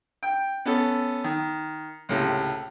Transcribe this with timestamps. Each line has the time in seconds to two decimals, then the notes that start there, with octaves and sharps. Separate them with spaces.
0.23 G5
0.65 B3 C#4 A4
1.24 D#3
2.09 C#2 A2 C3